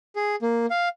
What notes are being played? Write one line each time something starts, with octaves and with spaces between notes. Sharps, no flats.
G#4
A#3
F5